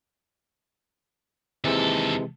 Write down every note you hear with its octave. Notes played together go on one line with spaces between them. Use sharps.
D#2 C3 E3 G#3 A4